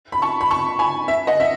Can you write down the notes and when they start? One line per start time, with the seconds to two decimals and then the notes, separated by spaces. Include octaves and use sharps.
0.12 B5
0.22 A5 C#6
0.41 B5
0.51 A5 C#6
0.79 G#5 B5
1.08 E5
1.27 D#5 F#5
1.40 E5